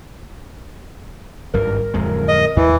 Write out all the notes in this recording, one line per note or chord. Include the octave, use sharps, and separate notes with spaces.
G#1 G2 A#4
D1 F2 G#3
D#5
D#2 E3